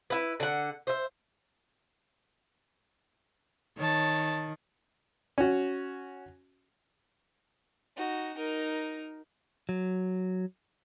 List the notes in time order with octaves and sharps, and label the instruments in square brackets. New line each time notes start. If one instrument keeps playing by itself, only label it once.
[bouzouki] E4 B4
D3 F#5
C5 E5
[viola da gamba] D#3 [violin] C#5 A5
[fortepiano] C#4 F#4
[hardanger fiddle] D#4 F#4
D#4 A#4
[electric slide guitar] F#3